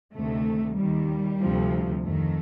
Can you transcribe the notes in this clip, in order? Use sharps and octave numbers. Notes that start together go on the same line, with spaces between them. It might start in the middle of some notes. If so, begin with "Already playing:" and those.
D2 C3 D#3 A3
D#2 D#3 G3
D2 C3 F3
F2 D#3 A3